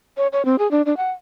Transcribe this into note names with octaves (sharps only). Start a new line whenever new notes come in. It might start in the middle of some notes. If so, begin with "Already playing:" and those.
C#5
C#5
C4
G#4
D4
D4
F#5